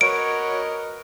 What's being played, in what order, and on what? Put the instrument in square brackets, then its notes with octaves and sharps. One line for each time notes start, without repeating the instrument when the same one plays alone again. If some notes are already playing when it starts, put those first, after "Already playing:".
[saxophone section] F#4 C#5 [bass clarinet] A#4 [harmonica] B4 D#5 [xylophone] D7